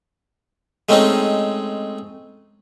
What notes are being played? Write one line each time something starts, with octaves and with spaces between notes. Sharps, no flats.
G#3 A3 C4 C#4 D#4